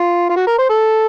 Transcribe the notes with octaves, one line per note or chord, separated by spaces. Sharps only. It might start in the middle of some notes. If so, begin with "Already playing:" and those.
Already playing: F4
F4
F#4
A#4
C5
A4